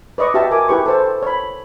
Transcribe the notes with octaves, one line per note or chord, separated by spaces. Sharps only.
B4 D5 D#5 C#6
F#4 G4 E5 G5 A5
A#4 G#5 D6
E4 G4 B4 C#6
A4 C5 A5
C#5 B5